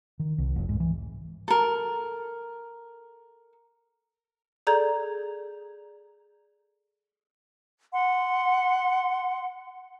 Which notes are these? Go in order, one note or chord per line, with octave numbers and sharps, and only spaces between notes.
D#3
C2
F1
G#2
E3
A4 A#4
G#4 A4 D5 A#5 G6 G#6
F#5 C6